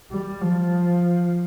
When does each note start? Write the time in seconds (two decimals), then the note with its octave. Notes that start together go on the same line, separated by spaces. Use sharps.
0.11 G3
0.42 F3